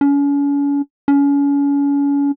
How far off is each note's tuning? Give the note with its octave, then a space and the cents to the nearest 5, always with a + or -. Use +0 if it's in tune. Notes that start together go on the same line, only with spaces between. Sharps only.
C#4 +40
C#4 +35